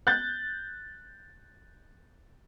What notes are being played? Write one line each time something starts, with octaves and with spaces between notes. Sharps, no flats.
F#6 G6 A6